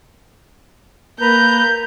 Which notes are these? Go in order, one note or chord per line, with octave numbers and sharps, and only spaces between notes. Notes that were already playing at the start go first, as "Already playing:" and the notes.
A#3 B4 A#5 G6